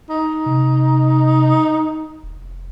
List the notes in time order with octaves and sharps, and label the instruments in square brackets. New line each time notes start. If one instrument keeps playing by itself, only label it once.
[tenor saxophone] D#4
[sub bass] C3
F1